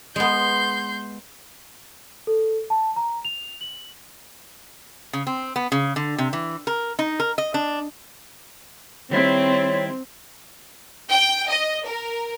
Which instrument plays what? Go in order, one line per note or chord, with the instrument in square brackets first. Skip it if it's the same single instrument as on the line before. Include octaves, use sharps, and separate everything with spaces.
[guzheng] G#3 B3 [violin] C6 G6
[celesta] A4
A5
A#5
F7
F#7
[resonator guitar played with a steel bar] C#3
C4
B3
C#3
D3
C3
E3
A#4
D#4
A#4
D#5
D4
[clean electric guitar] D#3 G3 E4 [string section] C4 [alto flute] C#5
[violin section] G5
D#5
A#4